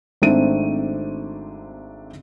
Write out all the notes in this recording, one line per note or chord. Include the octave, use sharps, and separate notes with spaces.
G#1 A3 C4 D4 D#4 D#7